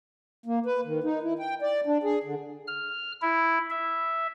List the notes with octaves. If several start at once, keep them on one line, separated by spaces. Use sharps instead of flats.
A#3
B4
D#3
D#4
E4
G5
D5
D4
G#4
D3
F6
E4
E5